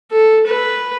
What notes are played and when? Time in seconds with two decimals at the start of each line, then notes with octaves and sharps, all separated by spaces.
0.11 A4
0.47 B4